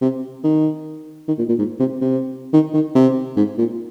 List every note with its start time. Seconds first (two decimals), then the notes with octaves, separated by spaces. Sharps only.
0.02 C3
0.44 D#3
1.28 D#3
1.38 A#2
1.49 A#2
1.59 G#2
1.80 C3
2.01 C3
2.53 D#3
2.74 D#3
2.95 C3
3.37 G#2
3.58 A#2